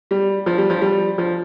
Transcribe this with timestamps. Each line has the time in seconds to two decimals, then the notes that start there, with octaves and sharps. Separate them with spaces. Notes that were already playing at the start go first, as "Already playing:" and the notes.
0.11 G3
0.46 F3
0.58 G3
0.70 F3
0.81 G3
1.18 F3